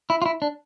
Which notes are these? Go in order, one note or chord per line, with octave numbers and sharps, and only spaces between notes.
E4
F4
E4
D4